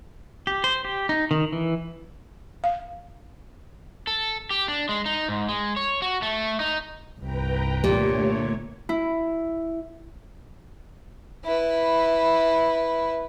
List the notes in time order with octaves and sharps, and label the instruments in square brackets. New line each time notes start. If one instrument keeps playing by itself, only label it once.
[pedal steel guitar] G4
C5
G4
D#4
D#3
E3
[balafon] F5
[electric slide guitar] A4
G4
D4
G#3
D#4
G#2
G#3
C#5
F#4
A3
D#4
[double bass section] G1 C2 [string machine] B4 G5 A#5
[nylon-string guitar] A#2 [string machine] D3 A3 C#5 [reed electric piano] G4
[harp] E4
[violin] E4 B4